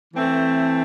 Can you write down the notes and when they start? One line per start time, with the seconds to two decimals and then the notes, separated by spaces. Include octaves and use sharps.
0.14 E3 A3 C4